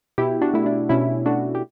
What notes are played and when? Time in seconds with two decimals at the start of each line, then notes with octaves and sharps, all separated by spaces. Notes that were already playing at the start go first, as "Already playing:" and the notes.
0.18 B2 E4 G4
0.42 D4 F#4
0.54 A3 E4
0.66 D4
0.89 B2 C#4 E4
1.26 A3 D4 F#4
1.55 G4